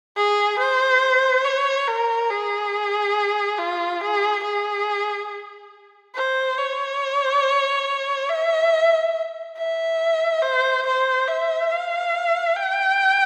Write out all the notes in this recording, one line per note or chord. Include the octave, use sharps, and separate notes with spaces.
G#4
C5
C#5
A#4
G#4
F4
G#4
G#4
C5
C#5
E5
E5
C5
C5
E5
F5
G5